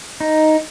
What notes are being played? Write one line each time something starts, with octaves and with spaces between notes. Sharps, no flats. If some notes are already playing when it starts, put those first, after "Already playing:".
D#4